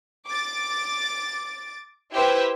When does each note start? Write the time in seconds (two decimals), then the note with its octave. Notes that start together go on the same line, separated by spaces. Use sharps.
0.27 D6 A6
2.13 E4 G4 B4 C5 E5